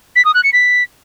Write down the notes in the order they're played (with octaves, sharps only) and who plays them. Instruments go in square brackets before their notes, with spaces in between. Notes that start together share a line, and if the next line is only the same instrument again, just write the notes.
[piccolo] B6
D#6
F#6
C#7
B6